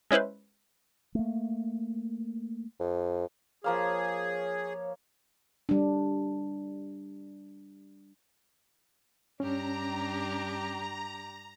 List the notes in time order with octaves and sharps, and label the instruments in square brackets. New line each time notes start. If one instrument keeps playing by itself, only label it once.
[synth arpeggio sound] G#3 C#4 E4 B4 C5
[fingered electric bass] A3 A#3
[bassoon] F2
[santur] F3 A#3 F5 [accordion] G#4 [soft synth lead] C#5
[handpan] G3 D4
[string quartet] G2 D4 G4 [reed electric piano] C#4 [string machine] A#5